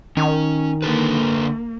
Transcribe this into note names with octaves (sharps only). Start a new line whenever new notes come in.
D#3 C#4
D3 A#3 A4 B4